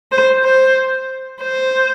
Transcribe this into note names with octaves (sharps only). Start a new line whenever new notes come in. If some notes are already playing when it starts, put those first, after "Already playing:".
C5
C5
C5